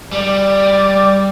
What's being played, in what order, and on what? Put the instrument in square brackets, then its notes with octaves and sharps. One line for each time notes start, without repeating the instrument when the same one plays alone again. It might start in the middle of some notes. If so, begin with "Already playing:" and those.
[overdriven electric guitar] G3 [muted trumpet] D5